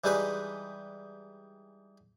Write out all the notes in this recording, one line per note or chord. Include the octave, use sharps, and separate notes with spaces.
E3 G3 G#3 D#4 G#4 B4